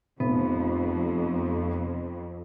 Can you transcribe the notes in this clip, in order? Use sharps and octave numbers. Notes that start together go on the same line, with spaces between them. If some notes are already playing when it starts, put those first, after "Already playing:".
F1 F2 B3